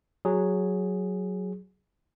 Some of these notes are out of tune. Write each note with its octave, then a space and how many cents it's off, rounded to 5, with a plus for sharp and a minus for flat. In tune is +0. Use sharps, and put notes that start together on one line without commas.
F#3 +0 G#4 +0